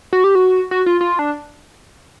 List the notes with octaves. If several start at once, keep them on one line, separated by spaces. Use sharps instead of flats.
F#4
G4
F#4
F#4
F4
F4
D4